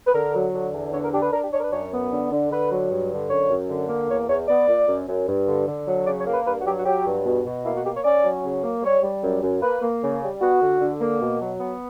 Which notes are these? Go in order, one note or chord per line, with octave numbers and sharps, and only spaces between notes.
B4
D3 A#4
F#3
D3
E2
D3 C#5
A#4
D4 G4
B4
D4 A#4
G4
D4 C#5
A#4
B4
F#2 C#5
B3
D3
D3
D3 B4
F#3
G2
D3
F#2 C#5
F#2
D3
A#3
E2 C#5
E2 C#5
B3 D5
A#2
F#2
F#2
G2
D3
D3
F#3
C#3 D5
C#5
A#3
B4
G2 B4
F#4
F#3 G4
F#4
F#3 G4
G2
B2
B2
A#3 E4
F#4
A#3 G4
C#5
C#4 D5
F#3
C#3
A#3
G3 C#5
G3
F#2
F#2
A#3 B4
A#3
C#3
G3
B3 F#4
D3
D3
A#3
B2
F#3
B3